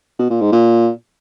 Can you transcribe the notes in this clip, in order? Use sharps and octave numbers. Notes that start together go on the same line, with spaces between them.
B2
A#2
G#2
A#2